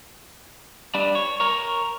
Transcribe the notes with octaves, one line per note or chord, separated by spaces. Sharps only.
G3 D4
C#5
A#4 C#5